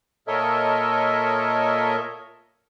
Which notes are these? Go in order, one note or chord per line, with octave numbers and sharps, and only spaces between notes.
A#2 A4 A#4 C#5 D#5 E5